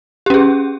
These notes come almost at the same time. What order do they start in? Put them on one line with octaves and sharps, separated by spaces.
G4 C#4 G#4